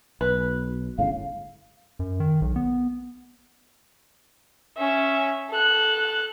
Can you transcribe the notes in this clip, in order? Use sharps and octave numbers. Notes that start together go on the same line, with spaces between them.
B1 B4
G1 A2 C#3 F5
F#2
D#3
B1
B3
C#4 E5
A4 F#6